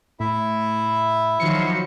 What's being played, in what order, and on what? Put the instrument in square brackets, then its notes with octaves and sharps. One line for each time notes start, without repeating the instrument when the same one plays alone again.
[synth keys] A2 [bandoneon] E4 E5
[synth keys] D#3 C#7 [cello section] F3 F#3